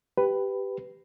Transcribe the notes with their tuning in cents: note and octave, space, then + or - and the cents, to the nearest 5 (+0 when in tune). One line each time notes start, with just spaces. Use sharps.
G4 +0 B4 +10